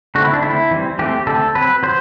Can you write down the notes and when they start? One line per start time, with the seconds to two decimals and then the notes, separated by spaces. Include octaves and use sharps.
0.15 D3 A3 C4 F#4
0.24 E4
0.33 D4
0.42 D3 A3 C4 E4
0.71 E3 G3 C4
0.99 E3 A3 C4 G4
1.27 D3 A3 C4 A4
1.55 F#3 C4 B4
1.83 F#3 C5